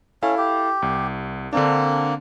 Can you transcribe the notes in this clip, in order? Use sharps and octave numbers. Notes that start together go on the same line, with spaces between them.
C#4 E4 A4 F5
G4
C2
D3 A#3 C4 D4